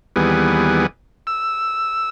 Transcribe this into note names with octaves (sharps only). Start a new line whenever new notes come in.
D#2 E3 G3 B3 G#4
E6